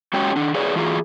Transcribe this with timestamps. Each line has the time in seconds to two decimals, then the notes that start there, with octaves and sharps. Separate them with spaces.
0.13 G#3 C#4 F#4 G4 C#5 G5
0.36 D#3 D4
0.54 G#4 B4 C#5 D5
0.76 E3 F4 F#4 G#4